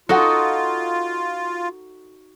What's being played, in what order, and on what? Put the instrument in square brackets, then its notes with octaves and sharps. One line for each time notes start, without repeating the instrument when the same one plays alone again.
[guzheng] D#4 F#4 [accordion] F4 [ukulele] A4 F#5